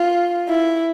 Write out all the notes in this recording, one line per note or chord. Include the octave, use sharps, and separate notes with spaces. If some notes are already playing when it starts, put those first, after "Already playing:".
Already playing: F4
E4